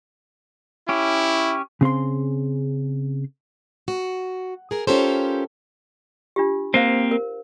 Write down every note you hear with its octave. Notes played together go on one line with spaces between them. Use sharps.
C#4 E4 G4
C#3 C4 G#4 C6
F#4
G#4 A#4
C#4 F4 G4 A4 A#4 C5
D4 F4 G4
A#3 C4 C5 F5
A#4